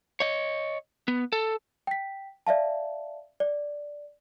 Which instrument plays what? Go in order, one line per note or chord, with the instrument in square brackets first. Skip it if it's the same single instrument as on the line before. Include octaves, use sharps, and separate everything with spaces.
[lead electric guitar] C#5 D#5
B3
A4
[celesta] G5 B6
D5 E5 F5 A5
D5